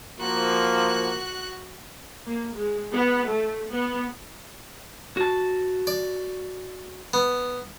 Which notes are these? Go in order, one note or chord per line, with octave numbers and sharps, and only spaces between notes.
F3 A#3 F#4 F#6
A#3
G#3
B3
A3
B3
F#4 A5
D5
B3